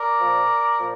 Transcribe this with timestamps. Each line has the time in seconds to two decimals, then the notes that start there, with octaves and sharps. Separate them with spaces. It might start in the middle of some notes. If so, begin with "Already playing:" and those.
Already playing: A#4 D5
0.20 A#2 F3
0.78 A#2 F3